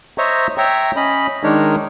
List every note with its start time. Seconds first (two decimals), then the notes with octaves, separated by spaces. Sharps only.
0.18 C5 C#5 D#5 E5 A#5 C#6
0.58 C#5 E5 G5 A#5 C#6
0.96 C#4 D#5 B5
1.44 D#3 G#3 D4 D#4 A#4 C#5